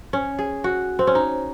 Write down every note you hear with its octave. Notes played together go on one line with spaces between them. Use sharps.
C#4
G#4
F#4
C4
C#4
D#4